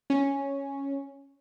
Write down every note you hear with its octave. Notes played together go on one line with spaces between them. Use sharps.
C#4